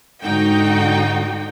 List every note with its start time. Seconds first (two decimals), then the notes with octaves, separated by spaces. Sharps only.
0.23 G#2 D3 D#4 F#4 G5